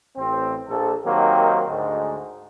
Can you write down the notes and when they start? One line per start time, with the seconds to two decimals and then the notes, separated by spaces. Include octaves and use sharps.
0.17 A1 C4
0.69 A#1 A4
1.05 D#3 F#3 A#3 C4 D#4 G4
1.68 D2 G#2 G#3